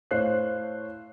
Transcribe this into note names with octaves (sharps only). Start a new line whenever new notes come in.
A2 C5 C#5 F5 F#6 C7